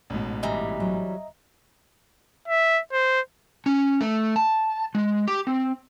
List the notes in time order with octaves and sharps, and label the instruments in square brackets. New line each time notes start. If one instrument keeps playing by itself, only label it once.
[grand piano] A1 G#2 B2
[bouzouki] E3 G3 [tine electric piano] D#5 E5 A#5
[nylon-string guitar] F#3
[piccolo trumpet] E5
C5
[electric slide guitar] C#4
A3
A5
G#3
G4
C4